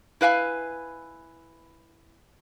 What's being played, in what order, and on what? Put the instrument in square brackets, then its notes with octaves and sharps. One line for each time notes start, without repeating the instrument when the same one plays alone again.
[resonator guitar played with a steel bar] E4 B4 F5 G#5